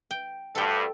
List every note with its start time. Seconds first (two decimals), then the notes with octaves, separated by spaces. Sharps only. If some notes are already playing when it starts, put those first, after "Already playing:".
0.11 G5
0.55 D2 G2 A4 G5